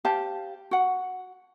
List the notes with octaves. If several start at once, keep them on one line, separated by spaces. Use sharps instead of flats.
G4 C5 F5 A5
F#4 F#5